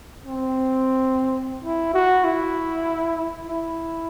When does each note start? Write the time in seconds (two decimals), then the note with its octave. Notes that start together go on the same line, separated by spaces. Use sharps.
0.26 C4
1.64 E4
1.94 F#4
2.24 E4
3.47 E4